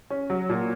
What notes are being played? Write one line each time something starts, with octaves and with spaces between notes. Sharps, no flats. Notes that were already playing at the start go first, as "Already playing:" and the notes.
C#4
F#3
A#2